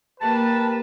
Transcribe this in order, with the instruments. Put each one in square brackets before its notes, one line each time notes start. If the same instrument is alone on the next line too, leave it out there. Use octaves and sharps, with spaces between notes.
[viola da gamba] A#3 [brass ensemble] G4 A#4 B4 [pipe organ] A5